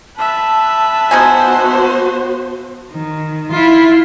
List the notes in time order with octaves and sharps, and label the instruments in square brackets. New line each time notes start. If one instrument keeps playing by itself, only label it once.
[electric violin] B4 E5 [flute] A5
[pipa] F3 D#4 G#5 [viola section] B3 F#4 C5
[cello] D#3
E4 F4